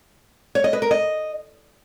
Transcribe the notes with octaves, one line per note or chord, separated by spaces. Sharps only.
C#5
D#5
B4
A#4
D#5